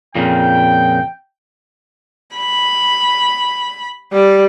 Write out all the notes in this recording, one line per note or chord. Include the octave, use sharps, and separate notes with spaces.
F2 A#2 C#3 G5
B5
G3